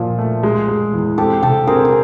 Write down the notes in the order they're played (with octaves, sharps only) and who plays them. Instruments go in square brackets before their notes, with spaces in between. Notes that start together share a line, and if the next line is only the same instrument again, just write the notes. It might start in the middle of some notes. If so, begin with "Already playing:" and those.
Already playing: [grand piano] A#2 F3
A3
G#3
G#3
E2
[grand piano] C4 [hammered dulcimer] G4 A4
[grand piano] C3 [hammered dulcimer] G4 A4
[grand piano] C4 [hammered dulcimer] G#4 A#4
[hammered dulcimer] G#4